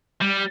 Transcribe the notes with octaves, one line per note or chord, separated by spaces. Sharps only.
G3